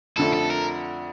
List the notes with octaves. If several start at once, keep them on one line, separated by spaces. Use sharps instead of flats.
F2 D3 A3 A4
A4
A#4